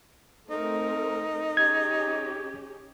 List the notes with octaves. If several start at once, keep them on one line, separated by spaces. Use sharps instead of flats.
A3 C4 D#4 A#4
C#4 G4 G#4 G#6